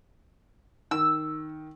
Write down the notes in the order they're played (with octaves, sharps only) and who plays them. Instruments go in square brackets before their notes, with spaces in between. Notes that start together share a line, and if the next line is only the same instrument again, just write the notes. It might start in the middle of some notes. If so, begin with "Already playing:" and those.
[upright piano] D#3 [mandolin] E6